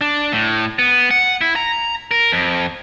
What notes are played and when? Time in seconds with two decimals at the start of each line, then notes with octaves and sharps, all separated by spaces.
0.01 D4
0.33 A2
0.79 B3
1.11 F#5
1.41 E4
1.56 A#5
2.11 A#4
2.32 F2